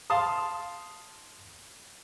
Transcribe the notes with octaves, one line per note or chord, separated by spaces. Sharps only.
F5 A5 C6 D#6